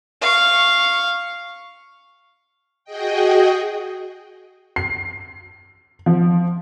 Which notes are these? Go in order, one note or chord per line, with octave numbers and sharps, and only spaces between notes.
F5 C#6
F#4 G#4 D#5 G5
C7
F3